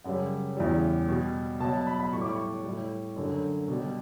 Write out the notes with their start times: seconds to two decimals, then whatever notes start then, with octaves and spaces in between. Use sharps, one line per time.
0.04 F#2 C#3 G3 F#5
0.57 E2 C#3 E3 G3
1.09 B2 G3
1.60 B2 F#3 A5
1.73 A5
1.87 B5
2.00 B5
2.12 A2 G3 C#6
2.21 D6
2.32 C#6
2.64 A2 G3
3.16 F#2 D3 F#3
3.68 B2 G3